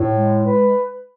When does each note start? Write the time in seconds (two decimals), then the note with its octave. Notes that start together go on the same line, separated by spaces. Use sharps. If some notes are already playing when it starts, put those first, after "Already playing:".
Already playing: A2
0.15 G#3
0.45 B4